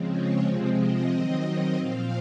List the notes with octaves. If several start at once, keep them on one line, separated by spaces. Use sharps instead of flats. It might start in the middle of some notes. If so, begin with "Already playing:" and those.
Already playing: C#3 F3 G#3 C4
C#5
C3 F3 G#3 C4
D#5
D#3 F#3 C4 D#5
D#5
A#2 F3 C4 F5